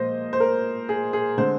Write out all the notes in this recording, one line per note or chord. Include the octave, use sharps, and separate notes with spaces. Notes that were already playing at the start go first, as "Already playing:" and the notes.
Already playing: A#2 F3 G#3 C5 D#5
C5
A#4
G#4
G#4
D3 G#3 C4 C5